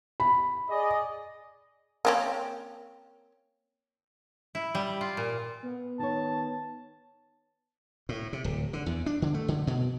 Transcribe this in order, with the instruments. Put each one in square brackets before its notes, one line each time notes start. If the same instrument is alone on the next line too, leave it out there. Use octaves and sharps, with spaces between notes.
[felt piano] B5
[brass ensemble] G#4 D5 D#5
[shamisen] A#3 C4 C#4
[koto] E4
G3
F4
A#2
[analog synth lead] B3
[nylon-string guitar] D#3 C#5 [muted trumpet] A5
[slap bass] A2
C3
D1
D3
E2
D4
D3
A3
D3
B2